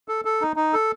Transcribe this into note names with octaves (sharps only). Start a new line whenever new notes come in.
A4
A4
D#4
D#4
A4